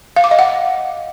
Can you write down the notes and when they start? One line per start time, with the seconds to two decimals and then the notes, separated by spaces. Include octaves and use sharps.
0.16 F5
0.24 D6
0.31 D#5
0.39 F#5